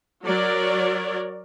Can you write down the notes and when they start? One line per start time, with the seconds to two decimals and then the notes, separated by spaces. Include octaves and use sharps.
0.23 F#3 A#4 C#5 D5